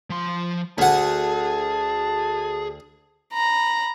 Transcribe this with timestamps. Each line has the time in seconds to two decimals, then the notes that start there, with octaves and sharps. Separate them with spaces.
0.10 F3 C6
0.78 D2 G#4 F#5 A5
3.33 A#5 B5